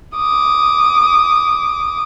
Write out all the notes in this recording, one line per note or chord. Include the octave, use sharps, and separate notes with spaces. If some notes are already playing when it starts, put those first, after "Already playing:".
D6 D#6